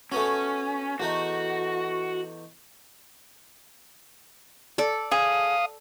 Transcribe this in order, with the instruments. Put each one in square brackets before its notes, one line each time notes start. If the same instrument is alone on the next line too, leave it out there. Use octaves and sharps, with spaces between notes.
[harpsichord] A3 B3 F#4 [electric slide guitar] C#4
[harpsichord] E2 A3 D#4 [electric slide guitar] F#4
[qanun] A4 D5
[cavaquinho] G#4 [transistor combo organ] F5 D#6